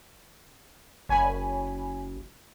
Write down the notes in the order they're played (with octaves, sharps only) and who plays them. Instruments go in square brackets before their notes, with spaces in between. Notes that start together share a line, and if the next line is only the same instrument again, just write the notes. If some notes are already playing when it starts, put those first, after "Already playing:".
[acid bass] F#1 [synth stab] C#5 G#5 B5